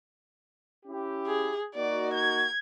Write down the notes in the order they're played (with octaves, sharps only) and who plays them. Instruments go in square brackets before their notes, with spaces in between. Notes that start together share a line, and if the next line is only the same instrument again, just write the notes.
[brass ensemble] C#4 E4 G4
[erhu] G#4
[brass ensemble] A#3 D#4 F#4 [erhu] D5
[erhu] G#6